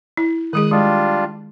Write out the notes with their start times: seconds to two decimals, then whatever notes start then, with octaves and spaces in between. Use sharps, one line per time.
0.17 E4
0.53 D#3 G#3 G#4 D#6 F#6
0.71 G3 G#3 D4 F4